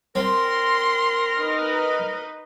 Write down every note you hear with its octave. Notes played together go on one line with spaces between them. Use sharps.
C4 A#4 C6
D#4 B4 D#5